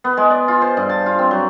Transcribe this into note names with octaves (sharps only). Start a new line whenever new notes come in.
B3
G#3
D5
F4
C5
G2
A5
F4
C4
F#3